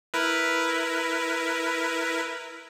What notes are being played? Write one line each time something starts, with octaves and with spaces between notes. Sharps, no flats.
E4 A#4 B4